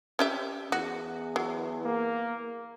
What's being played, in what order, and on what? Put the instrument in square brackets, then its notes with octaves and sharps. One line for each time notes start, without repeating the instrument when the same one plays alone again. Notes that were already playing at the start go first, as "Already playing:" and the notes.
[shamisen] C#4 G4 E5
[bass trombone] E2 [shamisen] F#4
[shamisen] F#3
[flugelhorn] A#3